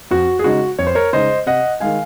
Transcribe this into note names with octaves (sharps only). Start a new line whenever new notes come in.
F2 F#4
G#4
C#3 G#3 D#4 F#4
F2 C#5
C5
A#4 C#5
C#3 G#3 D#4 C5 D#5
C3 D#5 F#5
D#3 G#3 F5 G#5